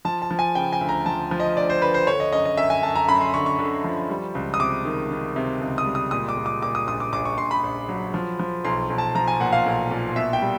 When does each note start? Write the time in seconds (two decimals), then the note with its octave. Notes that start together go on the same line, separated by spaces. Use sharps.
0.05 F3 A5
0.22 A5
0.31 F3
0.39 G#5
0.55 C#3 G5
0.73 G#5
0.81 D2
0.89 A#5
1.06 F3 A5
1.31 F3
1.40 D#5
1.57 D2 D5
1.70 C5
1.82 D2 B4
1.94 C5
2.07 D3 C#5
2.20 D#5
2.32 F#2 D#5
2.45 D#5
2.57 F#2 E5
2.70 G#5
2.83 F#2 A5
2.95 A#5
3.09 F#2 B5
3.21 C6
3.34 D3 C#6
3.46 C#6
3.59 D3
3.84 F3
4.09 G3
4.35 C#2
4.54 D#6
4.60 C3 D6
4.85 D#3
5.11 D#3
5.36 C3
5.61 C#2
5.78 D#6
5.86 G3
5.95 D#6
6.11 A#2 D#6
6.29 D6
6.37 A#2
6.46 D6
6.62 A#2 D6
6.75 D#6
6.87 A#1 D#6
7.00 D6
7.13 A#1 D6
7.25 C#6
7.38 A#1 C6
7.51 B5
7.64 A#1
7.89 F#3
8.14 F3
8.39 F3
8.65 B1 C6
8.90 B1
8.98 A5
9.15 F3 A#5
9.28 G#5
9.40 A#2 F#5
9.53 F5
9.66 B1
9.91 A#2
10.16 B2 E5
10.33 G5
10.42 G3